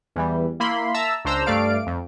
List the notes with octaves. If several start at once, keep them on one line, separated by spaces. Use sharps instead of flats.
E2 E3 G3
A#3 E4 B5 C6
E5 A5 A#5 E6
C#2 D4 C5 A#5 E6
G2 A3 D5 F5 D7
F2